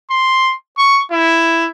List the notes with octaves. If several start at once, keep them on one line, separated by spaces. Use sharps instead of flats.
C6
C#6
E4